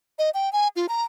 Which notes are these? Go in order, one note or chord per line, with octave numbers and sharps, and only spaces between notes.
D#5
G5
G#5
F4
A#5